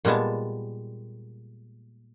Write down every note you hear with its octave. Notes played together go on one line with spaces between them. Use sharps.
A#2 G3 G#3 B3 A5